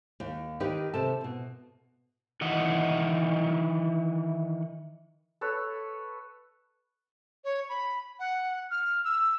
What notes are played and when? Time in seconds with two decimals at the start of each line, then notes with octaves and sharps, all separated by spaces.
0.20 D#2
0.60 D#3 D#4 G4 B4
0.94 C3 A4 A5
1.21 B2 E3
2.41 D#3 E3 D#5 F#5
5.41 A4 B4 C#5
7.44 C#5
7.69 B5
8.19 F#5
8.71 F6
9.05 E6